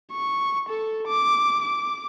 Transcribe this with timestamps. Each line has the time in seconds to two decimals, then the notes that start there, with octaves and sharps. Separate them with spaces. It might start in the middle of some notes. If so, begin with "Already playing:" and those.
0.12 C#6
0.69 A4
1.08 D6
1.62 D6